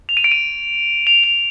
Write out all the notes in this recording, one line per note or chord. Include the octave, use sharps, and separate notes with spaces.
F7
D#7
D7
D#7
F7
F7